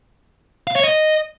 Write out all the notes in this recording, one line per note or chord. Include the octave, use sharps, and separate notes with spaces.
F5
C#5
D#5